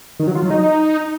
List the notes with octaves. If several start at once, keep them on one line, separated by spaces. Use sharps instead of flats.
D#3
F#3
F4
F#3
D#4